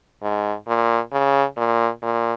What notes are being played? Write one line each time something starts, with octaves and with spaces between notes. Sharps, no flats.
G#2
A#2
C#3
A#2
A#2